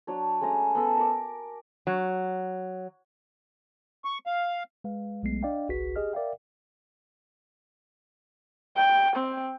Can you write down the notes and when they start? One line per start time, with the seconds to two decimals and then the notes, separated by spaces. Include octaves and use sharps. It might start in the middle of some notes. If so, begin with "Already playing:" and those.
0.07 F#3 D4 C#5
0.41 G#3 A3 C#4 A#5
0.75 B3 A4 B4
0.97 A#4 D6
1.87 F#3
4.05 C#6
4.26 F5
4.84 G#3 B4 F5
5.23 B1 F#3 G#3 A3 B3 C7
5.43 D4 D5 D#5 F5 G5
5.69 G1 C2 F#4 G#4 B4 B6
5.96 G4 G#4 D#5 F6
6.13 A#4 D5 E5 F5 G5
8.77 G5
9.16 C4